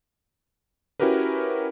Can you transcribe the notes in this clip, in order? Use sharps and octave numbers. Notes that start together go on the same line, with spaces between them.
C#4 E4 F#4 G4 A#4 B4